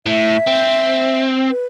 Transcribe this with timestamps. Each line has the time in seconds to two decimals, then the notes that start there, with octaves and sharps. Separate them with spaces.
0.06 A2 E5
0.48 C4
1.50 B4